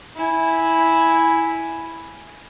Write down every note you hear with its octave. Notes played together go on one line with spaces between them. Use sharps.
E4 G#5